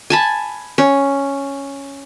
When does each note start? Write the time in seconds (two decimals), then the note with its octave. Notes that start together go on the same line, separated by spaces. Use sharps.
0.10 G#5 A5 B5
0.78 C#4